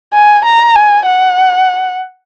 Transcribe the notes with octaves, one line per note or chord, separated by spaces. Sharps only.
G#5
A#5
G#5
F#5